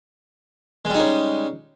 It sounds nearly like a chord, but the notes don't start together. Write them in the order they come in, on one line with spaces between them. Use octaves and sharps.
G#3 G3 D#4 C#3